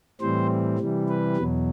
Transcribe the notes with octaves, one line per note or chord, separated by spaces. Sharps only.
A2 E3 G3 C4 C5
C3 E3 G3
B4
E2 B2 F#3